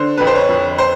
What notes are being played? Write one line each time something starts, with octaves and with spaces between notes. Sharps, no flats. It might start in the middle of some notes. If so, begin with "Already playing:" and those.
Already playing: D3 C5
F2 B4
C5
C#5
F2
C5